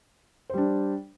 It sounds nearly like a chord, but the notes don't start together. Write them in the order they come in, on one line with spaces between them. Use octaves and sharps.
C5 G3 D4